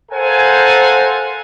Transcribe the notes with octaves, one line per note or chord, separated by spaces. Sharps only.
A4 A#4 C5 F5 F#5 G#5